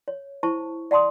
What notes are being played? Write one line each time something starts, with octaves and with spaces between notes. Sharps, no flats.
C#5
E4 C5 A5 C#6
D5 F#5 A5 C6 D#6